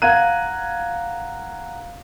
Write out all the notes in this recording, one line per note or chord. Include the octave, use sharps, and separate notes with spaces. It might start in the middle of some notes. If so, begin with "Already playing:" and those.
F5 F#5 A#5 F#6 G#6 D#7